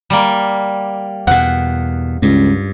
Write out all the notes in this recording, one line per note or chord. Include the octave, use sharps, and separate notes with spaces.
G3 A#3
E2 B2 F#5
C#2 G2